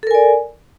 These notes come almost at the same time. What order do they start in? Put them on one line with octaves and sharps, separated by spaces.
A4 A#4 G#5 D5